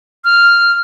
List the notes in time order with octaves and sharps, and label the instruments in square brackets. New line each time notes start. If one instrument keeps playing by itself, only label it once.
[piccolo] F6